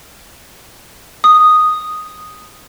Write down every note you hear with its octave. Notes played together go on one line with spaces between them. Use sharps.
D#6